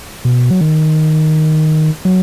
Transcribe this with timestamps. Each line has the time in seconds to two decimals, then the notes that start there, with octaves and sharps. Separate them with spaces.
0.25 B2
0.51 F#3
0.61 D#3
2.05 F#3